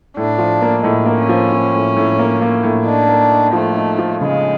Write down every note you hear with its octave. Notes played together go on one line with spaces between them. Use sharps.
A2 D4
F3
A#3
A2 G#3
A#3
C#4
F3
F3
A2
A2
A#3
A#3
A2
D4 D#4
A#3
D#4
F3 A3
D#4
F3
C#3 G#3